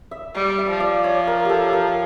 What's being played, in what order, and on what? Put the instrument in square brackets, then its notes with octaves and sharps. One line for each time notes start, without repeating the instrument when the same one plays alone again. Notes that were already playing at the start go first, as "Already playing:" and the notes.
[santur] E5
[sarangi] G3
[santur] E5
[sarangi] F3
[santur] D5
C#5
A#4
G4 A4
A#4